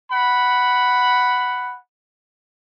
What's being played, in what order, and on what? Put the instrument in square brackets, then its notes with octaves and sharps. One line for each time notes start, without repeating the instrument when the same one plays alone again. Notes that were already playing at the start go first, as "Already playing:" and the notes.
[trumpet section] F#5 B5